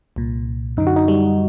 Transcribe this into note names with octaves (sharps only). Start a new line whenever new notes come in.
C2 A#2
F#2 D3 D#4
F#4
D#4
G3